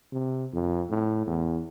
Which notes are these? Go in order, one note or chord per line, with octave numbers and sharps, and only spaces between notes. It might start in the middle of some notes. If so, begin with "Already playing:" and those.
C3
F2
A2
E2